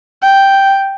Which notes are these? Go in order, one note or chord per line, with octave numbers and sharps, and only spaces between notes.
G5